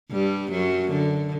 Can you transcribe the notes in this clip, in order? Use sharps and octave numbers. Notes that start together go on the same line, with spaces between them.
G2 G3
F#2 F#3
D3